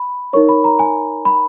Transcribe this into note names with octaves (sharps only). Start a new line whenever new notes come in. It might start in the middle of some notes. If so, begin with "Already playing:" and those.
Already playing: B5
D#4 A#4 C#5 C#6
B5
A#5
G#5
B5